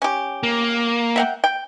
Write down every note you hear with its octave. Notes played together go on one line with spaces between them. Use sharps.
C#4 G4
A#3
E5 F#5 G5
G5